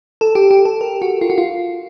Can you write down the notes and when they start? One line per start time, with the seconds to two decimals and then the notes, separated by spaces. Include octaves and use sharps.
0.21 A4
0.35 G4
0.51 G4
0.65 A4
0.81 A#4
1.02 F#4
1.21 F4
1.30 F#4
1.38 F4